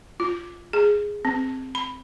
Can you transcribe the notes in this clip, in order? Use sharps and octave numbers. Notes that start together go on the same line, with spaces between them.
F4
G#4
C4
B5